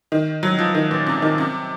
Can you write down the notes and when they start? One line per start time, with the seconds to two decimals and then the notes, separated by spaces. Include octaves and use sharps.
0.12 D#3
0.43 F#3
0.59 F3
0.74 D#3
0.91 A#2
1.07 C3
1.22 D#3
1.38 C3